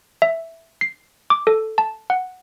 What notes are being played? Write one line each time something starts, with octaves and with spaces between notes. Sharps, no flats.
E5
C7
D6
A4
A5
F#5